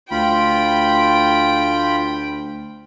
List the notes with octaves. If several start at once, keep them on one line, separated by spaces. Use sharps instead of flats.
D2 F4 G5 B5